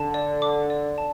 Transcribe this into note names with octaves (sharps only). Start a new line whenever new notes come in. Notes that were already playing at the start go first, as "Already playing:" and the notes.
Already playing: D3 A5
D5
D6
D5
A5